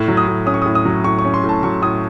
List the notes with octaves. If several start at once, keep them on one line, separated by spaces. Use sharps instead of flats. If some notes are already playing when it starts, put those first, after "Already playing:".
Already playing: A2
F#3
D#6
A2
C#4 D#6
C#6
D#6
A2
D#6
F#3
A2 C#6
C#6
C#4
C6
A2
A5
F#3 C#6
A2 D#6